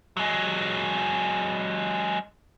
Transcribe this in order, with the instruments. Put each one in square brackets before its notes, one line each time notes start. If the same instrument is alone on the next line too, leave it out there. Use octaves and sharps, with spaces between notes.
[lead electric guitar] F#3 G#3